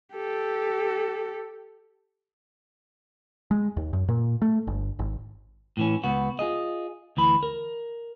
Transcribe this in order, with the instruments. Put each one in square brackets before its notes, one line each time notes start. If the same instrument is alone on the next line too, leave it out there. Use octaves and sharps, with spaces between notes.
[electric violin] G4 A4
[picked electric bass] G#3
D#2
F#2
A#2
A3
G1
G#1
[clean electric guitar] A2 E3 C#4
C#2 B3 F#4
F4 G#4 D#5
D2 E3 B5
A#4